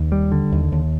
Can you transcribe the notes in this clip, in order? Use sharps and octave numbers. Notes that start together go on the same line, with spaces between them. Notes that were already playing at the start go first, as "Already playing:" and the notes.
Already playing: D#2
G3
D3
D#2
D#2